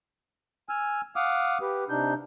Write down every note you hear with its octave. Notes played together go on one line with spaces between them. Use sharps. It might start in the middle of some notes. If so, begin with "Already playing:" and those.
G#5 E6 F6
F5 F#5 D6 D#6 F6
G4 B4
C3 D4 D#4 G6